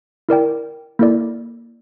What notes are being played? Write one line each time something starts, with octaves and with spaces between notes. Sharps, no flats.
E4 A#4 D5 G5
A#3 E4 A4 D5